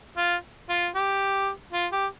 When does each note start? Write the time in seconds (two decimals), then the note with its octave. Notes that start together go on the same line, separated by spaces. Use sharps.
0.17 F4
0.69 F4
0.95 G4
1.73 F4
1.92 G4